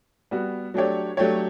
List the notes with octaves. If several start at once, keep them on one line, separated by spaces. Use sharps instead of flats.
G3 B3 F#4
F#3 A3 D4 G4 C#5
F#3 A3 D4 G4 C#5